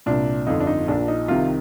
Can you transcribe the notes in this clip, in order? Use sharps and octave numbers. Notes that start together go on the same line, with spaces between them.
C2 A#2 D4
G1 F2 D3 D#4
D4
D#4
A#1 A#2 D4
D#4
C2 C3 D#3 F4